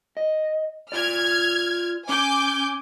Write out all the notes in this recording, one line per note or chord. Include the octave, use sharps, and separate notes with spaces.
D#5
F4 D5 F6 G#6
C#4 G#5 D6 G6